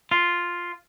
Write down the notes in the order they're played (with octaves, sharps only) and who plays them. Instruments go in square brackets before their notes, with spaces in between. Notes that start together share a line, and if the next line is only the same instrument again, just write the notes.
[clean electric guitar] F4